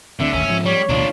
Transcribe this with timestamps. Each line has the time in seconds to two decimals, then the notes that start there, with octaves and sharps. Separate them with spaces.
0.20 D2 D3 D#3 C4 E5
0.33 G#1 D#2 A2 C#4
0.48 G#2 D#3 F3
0.65 G3 C#5
0.89 A1 D2 B2 D4 F4